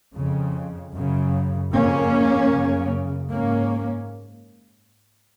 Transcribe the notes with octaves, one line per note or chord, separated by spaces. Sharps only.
F2 C#3
F#2 C#3
F2 C#3 A#3 C#4
F#2 C#3
G#2 A#3 C#4